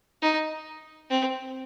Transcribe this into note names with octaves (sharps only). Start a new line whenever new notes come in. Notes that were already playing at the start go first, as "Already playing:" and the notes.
D#4
C4